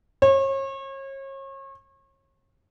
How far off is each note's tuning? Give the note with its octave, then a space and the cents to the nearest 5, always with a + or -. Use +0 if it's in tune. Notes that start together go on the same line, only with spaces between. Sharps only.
C#5 -35